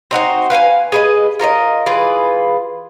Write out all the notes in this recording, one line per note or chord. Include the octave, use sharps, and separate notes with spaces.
C4 D#4 F#4 C5
B4 F5 G5 G#5
G#4 B4 D#5
F4 A#4 C#5 D#5
E3 F4 G#4 B4